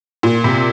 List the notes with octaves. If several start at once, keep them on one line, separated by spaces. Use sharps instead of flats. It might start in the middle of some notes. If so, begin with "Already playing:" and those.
A#2
C3